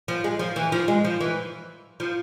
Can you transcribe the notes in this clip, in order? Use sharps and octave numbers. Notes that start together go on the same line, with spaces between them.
F3
G#3
F3
E3
F3
G#3
F3
E3
F3